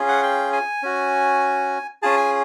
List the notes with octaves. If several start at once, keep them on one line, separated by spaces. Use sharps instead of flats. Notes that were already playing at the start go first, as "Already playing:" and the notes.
Already playing: C#4 F4 G#4
F#5
G5
G#5
C#4 F#4
C#4 F4 G#4 A5
G#5